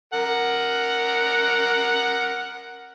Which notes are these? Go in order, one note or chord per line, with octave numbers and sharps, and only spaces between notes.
A#4 F#5